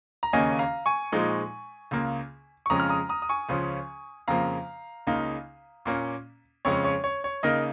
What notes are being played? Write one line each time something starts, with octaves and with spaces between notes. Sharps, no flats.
A#5
D#2 C#3 A#3 C#4 D#5 G#5
F5 A#5
G#5 C#6
A#2 F3 G#3 D#4
C#2 C#3 A#3
C#6
F2 C#3 F3 G#3 C#4 A#5 D#6
F6
A#5 D#6
A#5 D#6
D#6
G#5 C#6
C#2 C#3 F3 C#4
F2 C#3 F3 A#3 F5 A#5
C#2 C#3 A#3 D#4
A#2 A#3 C#4
F2 C#3 G#3 C#4 C#5
C#5
C#5
C#5
C#3 A#3 D#4 A#4 D#5